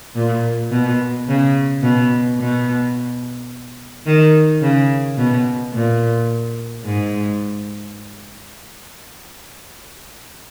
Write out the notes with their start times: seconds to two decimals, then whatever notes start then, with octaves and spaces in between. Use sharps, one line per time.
0.16 A#2
0.71 B2
1.28 C#3
1.83 B2
2.39 B2
4.06 D#3
4.62 C#3
5.18 B2
5.73 A#2
6.85 G#2